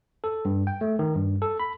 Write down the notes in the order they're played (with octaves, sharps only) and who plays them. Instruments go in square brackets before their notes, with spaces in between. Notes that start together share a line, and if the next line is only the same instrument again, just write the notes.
[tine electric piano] A4
G2
G5
A3
D#3
G2
A4
B5